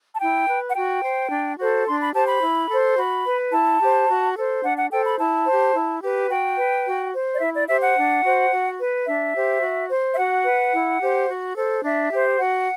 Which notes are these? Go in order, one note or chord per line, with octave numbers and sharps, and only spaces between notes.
A5
E4 G5
B4
F#5
F#4 G5
C5
D4
F#4 A4 C5
D4 C6
B5
G4 C5 A5
B5
E4
A4 C5
F#4 B5
B4
E4 A5
G4 C5
F#4
A4 C5
D4 F#5
F#5
A4 C5 G5
B5
E4 A5
G4 C5
E4
G4 B4
F#4 G5
B4
F#4
C5
D5
E4 E5
D5
G4 C5 E5
F#5
D4
F#4 C5
F#4
B4
D4 E5
G4 C5
F#4
C5
E5
F#4 F#5
B4
E4
G4 C5
F#4
A4 C5
D4 E5
G4 C5
F#4 F#5